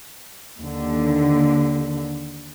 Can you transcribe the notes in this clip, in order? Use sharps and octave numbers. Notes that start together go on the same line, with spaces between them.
D#2 D3